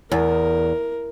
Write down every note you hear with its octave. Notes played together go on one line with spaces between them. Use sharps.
E2 A#4